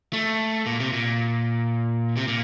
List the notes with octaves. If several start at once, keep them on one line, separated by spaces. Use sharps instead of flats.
A3
A#2
C3
A#2
C3
A#2